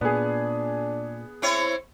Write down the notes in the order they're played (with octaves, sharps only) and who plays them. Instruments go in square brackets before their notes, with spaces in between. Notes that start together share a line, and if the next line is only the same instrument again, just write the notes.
[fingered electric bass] A#2 [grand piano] B3 G#4 [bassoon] D4
[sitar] C4 E4 C#5